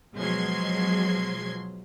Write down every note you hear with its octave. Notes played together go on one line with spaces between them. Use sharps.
B2 F3 F#3 G#3 C6 G#6